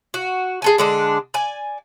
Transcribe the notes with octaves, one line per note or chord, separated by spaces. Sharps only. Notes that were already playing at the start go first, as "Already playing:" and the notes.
F#4
G#4 A4 G#5
D3 G#3 D4
D5 G#5